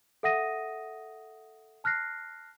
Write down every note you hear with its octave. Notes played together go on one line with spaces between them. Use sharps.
A4 E5 F#5 D#6 A#6 D#7
A5 F6 F#6 A#6 C7